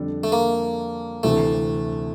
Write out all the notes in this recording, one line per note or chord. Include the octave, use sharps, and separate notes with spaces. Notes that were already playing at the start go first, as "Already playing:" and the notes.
Already playing: F2 D3 G3 D4 A4
A3
A#3
D2 C3 E3 A3